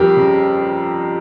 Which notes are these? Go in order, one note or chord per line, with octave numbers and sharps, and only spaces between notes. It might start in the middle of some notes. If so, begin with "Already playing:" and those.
Already playing: F2 G3 G4 A#4
C#3